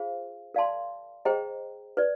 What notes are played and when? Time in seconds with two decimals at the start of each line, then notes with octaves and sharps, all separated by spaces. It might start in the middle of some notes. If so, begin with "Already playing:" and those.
Already playing: F4 G#4 C5 F5
0.54 A#4 D5 F5 A5 C6
1.25 G#4 C5 D#5 G5 A#5
1.97 B4 D5